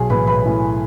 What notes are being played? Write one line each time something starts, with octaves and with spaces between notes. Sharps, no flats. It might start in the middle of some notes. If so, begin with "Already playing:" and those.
Already playing: B1 G#4 G#5
A2 E3 B4 B5
B1 B4 B5
A2 E3